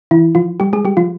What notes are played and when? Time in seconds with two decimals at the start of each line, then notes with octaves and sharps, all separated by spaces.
0.11 E3 E4
0.35 F3 F4
0.60 G3 G4
0.73 G#3 G#4
0.85 G3 G4
0.97 F3 F4